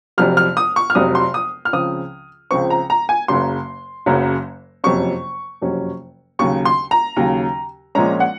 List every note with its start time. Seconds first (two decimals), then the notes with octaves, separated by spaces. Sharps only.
0.18 F1 F2 C3 F#3 F6
0.37 F6
0.57 D#6
0.76 C#6
0.90 F6
0.95 F1 F2 C3 F#3 D#6
1.15 C6
1.34 D#6
1.65 F6
1.73 C#2 C#3 F3 C4 D#6
2.51 C#2 C#3 F3 C4 C#6
2.70 A#5
2.90 A#5
3.09 G#5
3.28 F#1 F#2 C#3 F#3 C6
4.06 F#1 F#2 C#3 F#3
4.84 F#1 F2 C3 F#3 C#4 C#6
5.62 F#1 F2 C3 F#3 C#4
6.39 D#2 C#3 F#3 C#6
6.65 C6
6.91 A#5
7.16 D#2 C#3 F#3
7.95 A#1 A#2 F3 G#3 C#4 A#5
8.20 F#5